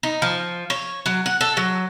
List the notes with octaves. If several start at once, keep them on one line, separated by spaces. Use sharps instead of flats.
D#4
F3
C#5
F#3
F#5
A4
F#3